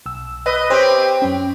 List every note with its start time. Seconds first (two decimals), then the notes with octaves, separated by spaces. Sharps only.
0.06 B1 E6
0.46 B4 D#5
0.70 C4 G4 C5 C#5
1.22 F#2 C#4